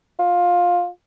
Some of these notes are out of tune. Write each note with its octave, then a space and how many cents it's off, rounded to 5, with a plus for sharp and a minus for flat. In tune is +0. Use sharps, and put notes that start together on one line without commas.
F4 +15